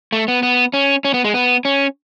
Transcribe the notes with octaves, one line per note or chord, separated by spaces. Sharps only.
A3
B3
B3
C#4
C#4
B3
G#3
B3
C#4